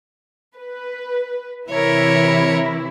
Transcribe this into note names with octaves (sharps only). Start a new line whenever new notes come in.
B4
C3 E3 E4 A#4 C#5